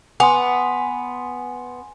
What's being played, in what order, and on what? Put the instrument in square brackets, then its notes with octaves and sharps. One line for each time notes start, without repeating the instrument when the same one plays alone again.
[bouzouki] B3 [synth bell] G#5 C6